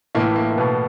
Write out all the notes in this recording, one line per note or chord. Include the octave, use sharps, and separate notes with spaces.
A2 E3 A3 A#3
A#3
A#3
B2 B3